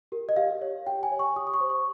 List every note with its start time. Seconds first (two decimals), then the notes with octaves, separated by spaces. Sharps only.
0.12 G4 A#4
0.29 D#5
0.36 G4 F5
0.62 C#5
0.87 G4 G5
1.03 G#5
1.12 C#5
1.19 C#6
1.36 G4 D#6
1.47 D#6
1.54 C#6
1.61 C5
1.69 C#6